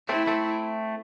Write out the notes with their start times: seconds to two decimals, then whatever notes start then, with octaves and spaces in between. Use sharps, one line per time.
0.08 A3 C4 E4
0.27 A3 C4